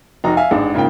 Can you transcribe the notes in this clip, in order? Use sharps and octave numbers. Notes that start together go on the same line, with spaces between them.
F1 D#4 F#4 A#5
E5 F5 G#5
A1 G#2 D4 G#4
G#2 C#3 A#3 F4 A#4 G5